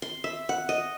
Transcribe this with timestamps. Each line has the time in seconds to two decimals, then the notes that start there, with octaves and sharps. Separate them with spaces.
0.02 C6
0.24 E5
0.49 F#5
0.69 D#5